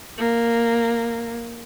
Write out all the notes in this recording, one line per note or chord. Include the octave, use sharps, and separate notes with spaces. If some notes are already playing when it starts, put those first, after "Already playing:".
A#3